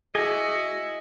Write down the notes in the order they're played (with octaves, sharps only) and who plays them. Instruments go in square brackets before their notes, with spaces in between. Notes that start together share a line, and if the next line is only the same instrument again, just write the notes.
[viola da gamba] E4 F#4 [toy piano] G#4 [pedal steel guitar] D#5 G#5